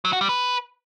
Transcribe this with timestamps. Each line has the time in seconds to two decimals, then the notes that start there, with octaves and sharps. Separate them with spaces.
0.05 F#3
0.13 F#4
0.21 G3
0.29 B4